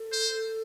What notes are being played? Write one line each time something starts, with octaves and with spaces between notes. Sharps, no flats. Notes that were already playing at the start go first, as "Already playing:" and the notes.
Already playing: A4
C5